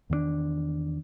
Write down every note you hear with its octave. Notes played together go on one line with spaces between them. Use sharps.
E2 D#3 A3 D4